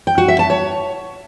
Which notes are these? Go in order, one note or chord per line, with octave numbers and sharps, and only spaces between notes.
G5
F#4
E5
A5
C#5